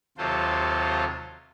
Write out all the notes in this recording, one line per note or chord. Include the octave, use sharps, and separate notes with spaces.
D#2 C3 F#3 F4 A4 C5